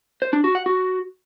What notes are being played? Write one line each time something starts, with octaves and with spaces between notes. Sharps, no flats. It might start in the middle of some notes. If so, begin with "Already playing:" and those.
C5
D4
F#4
F#5
F#4